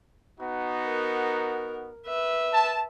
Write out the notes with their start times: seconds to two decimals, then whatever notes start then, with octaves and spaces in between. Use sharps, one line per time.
0.40 B3 D#4 F#4
0.85 A#4
2.06 B4 E5
2.53 A5